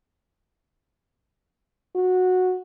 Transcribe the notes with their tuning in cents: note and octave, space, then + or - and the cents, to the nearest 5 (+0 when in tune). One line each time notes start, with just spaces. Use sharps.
F#4 -10